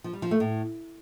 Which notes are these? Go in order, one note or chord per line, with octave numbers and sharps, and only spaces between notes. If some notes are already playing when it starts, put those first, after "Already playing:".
F3
G3
F3
A3
A2